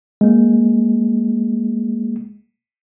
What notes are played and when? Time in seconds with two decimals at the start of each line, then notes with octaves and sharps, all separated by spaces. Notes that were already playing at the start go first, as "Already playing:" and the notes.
0.21 G#3 A#3